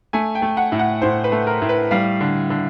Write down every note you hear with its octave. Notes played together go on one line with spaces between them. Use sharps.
A3 G#5
G5
A3
F#5
A2
F#5
A2 C5
B4
A3
A#4
A2
B4
G3 F5
D3
D3